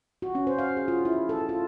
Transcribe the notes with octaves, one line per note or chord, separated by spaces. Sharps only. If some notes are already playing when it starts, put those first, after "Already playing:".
F#4
C#4
C5
F5
G#4
F4
E4
A4
F4